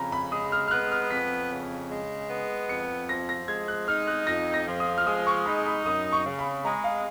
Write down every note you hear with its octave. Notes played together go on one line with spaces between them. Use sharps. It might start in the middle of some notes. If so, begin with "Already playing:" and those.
Already playing: F2 C#3 A#5 B5
B5
G#3 D#6
F6
F6
B3 F#6
F6
F2 B6
C#3
G#3
B3
F2 C#7
F3 A#6
A#6
G#3 G#6
F#6
D#4 F6
F#6
F2 A#6
A#6
F3
D#6
F6
G#3 D#6
C#6
D#4 B5
B5
F#2 D#6
C#6
C#3
B5
G#3 A#5
F5